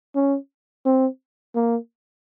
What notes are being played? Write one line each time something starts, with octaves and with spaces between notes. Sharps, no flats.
C#4
C4
A#3